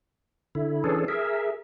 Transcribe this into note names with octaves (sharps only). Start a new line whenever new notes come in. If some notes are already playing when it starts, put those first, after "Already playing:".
D3 E4
E3 C#4 D4 G#4 A4
G#4 A#4 E5